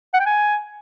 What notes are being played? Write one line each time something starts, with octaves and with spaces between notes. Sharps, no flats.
F#5
G5
G#5